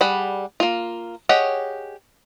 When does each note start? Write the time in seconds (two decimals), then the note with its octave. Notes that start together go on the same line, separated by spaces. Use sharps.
0.01 G3 G#4 F#5 B5
0.60 A#3 F4
1.29 G4 G#4 C#5 D#5 F#5